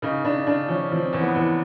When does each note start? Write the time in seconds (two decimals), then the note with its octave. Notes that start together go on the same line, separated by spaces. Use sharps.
0.02 C#3 D#4
0.24 C#3 D4
0.47 C#3 D4
0.68 F3 C#4
0.91 F3 C4
1.13 E2
1.20 B3
1.35 E2